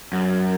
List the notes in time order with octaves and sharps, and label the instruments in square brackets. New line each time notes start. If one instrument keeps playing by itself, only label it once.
[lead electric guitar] F#2